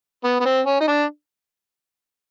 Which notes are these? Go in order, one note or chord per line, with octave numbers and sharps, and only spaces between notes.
B3
B3
C4
C#4
D#4
D4